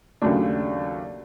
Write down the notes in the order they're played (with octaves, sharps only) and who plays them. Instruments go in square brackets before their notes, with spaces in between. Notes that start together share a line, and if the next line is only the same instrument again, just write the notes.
[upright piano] D#2 C#3 F#3 A3 D4